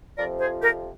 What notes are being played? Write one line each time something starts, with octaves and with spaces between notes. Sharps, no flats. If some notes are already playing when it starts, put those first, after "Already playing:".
F2 C3 F3 A#4 D5
G#4 C5
G4 A#4